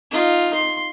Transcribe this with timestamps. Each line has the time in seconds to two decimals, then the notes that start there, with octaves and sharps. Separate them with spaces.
0.11 D#4 F4
0.54 C6